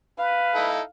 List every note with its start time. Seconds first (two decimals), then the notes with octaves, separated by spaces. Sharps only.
0.18 B4 F5
0.55 D#4 E4 A4